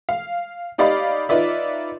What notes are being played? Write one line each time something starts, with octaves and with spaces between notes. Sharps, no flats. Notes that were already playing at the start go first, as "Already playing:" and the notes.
F5
D#4 G4 D5 D#5 F5 B5
D#4 F4 B4 D5 E5